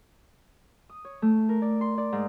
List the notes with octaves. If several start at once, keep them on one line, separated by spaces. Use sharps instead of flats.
D#6
C#5
A3
A#4
D5
C6
D5
G#2